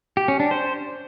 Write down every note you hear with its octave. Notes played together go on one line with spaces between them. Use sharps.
G4
C#4
D4
C5